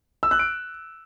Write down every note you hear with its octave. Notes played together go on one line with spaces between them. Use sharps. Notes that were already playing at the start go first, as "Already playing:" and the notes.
E6
F#6
D7